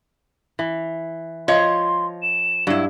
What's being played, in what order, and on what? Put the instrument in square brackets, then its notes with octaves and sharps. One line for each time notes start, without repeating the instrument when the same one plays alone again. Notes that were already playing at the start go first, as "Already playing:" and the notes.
[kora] E3
[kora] F3 [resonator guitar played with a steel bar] C#5 D#5 [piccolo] C6
[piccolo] E7
[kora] G2 [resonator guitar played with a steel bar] F#3 E4